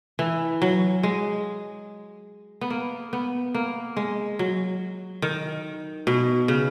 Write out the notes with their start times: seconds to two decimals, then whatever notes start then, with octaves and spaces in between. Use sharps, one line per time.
0.19 E3
0.62 F#3
1.03 G#3
2.61 B3
2.70 A#3
3.13 B3
3.55 A#3
3.97 G#3
4.39 F#3
5.22 D#3
6.07 B2
6.48 C#3